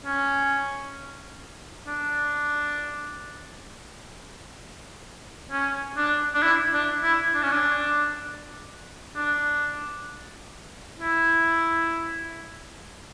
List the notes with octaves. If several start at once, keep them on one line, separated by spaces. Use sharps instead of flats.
C#4
D4
C#4
D4
D4
E4
D4
E4
D4
C#4
D4
D4
E4